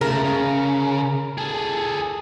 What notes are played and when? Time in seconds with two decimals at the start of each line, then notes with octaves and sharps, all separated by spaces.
0.01 C#3 A3 A#4
0.24 C#3
1.38 G#4 A4